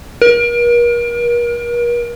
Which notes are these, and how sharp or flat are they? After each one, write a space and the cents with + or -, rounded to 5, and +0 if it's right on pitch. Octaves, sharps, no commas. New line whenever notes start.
A#4 +40